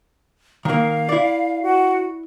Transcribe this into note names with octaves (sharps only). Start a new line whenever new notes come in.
D#3 A#3 F5
E4 D5
F#4